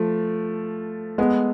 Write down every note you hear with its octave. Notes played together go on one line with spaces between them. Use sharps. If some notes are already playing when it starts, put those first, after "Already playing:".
Already playing: F3 A3
G#3 B3